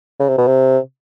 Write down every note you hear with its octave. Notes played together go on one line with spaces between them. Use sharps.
C#3
C3
B2
C3